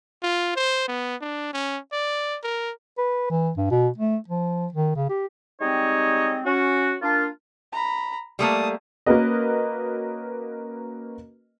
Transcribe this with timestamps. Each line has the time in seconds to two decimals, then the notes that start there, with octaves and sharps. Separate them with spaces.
0.23 F4
0.56 C5
0.88 B3
1.21 D4
1.54 C#4
1.92 D5
2.44 A#4
2.98 B4
3.30 E3
3.57 G2
3.71 B2
3.98 A3
4.28 F3
4.73 D#3
4.96 C#3
5.09 G4
5.60 G3 G#3 C4 D#4 C#5 D#5
6.44 C#4 F#4
7.02 A#3 D4 F4
7.72 A#5 B5
8.39 G3 A3 A#3 A5 D#6
9.06 A#3 C#4 F#4 A#4 B4 D#5